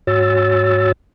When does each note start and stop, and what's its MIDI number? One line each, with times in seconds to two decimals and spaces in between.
0.07 0.92 44
0.07 0.92 66
0.07 0.92 73
0.07 0.92 88
0.07 0.92 93